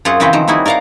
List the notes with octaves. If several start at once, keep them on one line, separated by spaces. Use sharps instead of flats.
F#2 C4 F4 G#4 F#5
C#3 E3 C4 F#4 B4 G5
D#3 F3
G3 D#4 E4 F#4 G#4
A#4 D5 F5 F#5 A#5